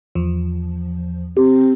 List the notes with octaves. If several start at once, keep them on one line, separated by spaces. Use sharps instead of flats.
E2 F3
C4 G4